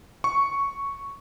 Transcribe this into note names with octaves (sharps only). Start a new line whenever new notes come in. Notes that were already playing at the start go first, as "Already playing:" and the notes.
C#6